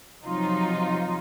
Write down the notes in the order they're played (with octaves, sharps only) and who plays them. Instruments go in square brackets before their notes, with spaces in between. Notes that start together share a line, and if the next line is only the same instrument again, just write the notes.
[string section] C3 F3 F#3 D#4 F4